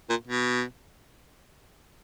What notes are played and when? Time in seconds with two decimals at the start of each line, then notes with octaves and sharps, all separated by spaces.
0.09 A#2
0.27 B2